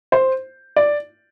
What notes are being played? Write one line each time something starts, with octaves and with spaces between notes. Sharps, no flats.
C5
D5